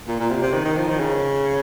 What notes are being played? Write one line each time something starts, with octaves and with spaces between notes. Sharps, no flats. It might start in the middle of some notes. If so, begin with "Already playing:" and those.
A#2
A#2
C3
C3
D#3
D#3
F3
D#3
C#3